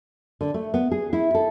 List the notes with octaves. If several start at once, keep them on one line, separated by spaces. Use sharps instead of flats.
D3
A3
B3
G#4
E4
A4